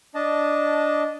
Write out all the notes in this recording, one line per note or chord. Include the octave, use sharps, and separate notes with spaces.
D4 D#5 A5